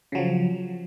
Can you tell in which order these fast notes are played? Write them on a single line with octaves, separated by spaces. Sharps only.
C#3 F#3 F3